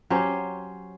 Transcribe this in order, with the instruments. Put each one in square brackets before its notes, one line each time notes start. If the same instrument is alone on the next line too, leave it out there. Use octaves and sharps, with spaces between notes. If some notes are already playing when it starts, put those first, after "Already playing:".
[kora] F#3 C#4 G4 C5